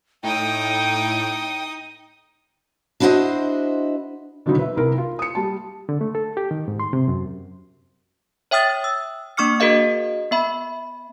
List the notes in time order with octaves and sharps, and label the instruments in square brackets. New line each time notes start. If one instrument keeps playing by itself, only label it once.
[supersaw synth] A2 [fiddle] D#4 D#6 [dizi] G5
[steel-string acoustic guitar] D4 E4 F#4 A4 C5 D#5
[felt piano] B2 D3 D#3 F#3 D#4 E4
B4 E5
C2 E4 A#4
F4
D#6 C#7
G3 A5
[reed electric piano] D3
A3
A4
G4
D#3
G#2
C6
C3
F#2
[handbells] C#5 E5 G5 D#6 F6 A6
E6
A#3 D4 C#6 D6 F6 C#7
F#4 G#4 A#4 D#5 F5
B3 E5 B5